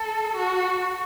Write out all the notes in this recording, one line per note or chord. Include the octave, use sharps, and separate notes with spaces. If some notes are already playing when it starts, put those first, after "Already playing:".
Already playing: A4
F#4